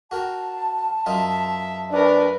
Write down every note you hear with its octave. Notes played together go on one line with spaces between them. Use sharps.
F#4 A#4 G5 A5
F#2 D#4 F4 E5
D4 A#4 B4